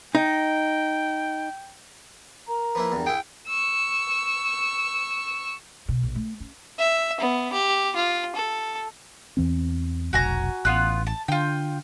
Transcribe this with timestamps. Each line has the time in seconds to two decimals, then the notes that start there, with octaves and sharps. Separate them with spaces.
0.15 D#4 G5
2.48 A#4 A#5
2.75 F3 A#3 E4 B4
2.92 E2 G2
3.06 E4 G#4 G5
3.47 C#6 E6
5.88 B2
6.03 A#1
6.15 A3
6.40 C#4
6.79 E5
7.20 B3
7.53 G4
7.96 F4
8.36 A4
9.37 E2 E3 C4
10.13 F1 B1 F#4 G#5 A#5
10.65 A1 B3 F4 F#6
11.07 A5
11.28 D3 F4 G5